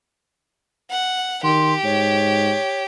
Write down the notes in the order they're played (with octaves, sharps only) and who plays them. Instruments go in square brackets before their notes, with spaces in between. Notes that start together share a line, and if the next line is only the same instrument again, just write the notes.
[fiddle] F#5
[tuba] D#3 [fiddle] G4 [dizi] C6
[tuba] G#2 [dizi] C#5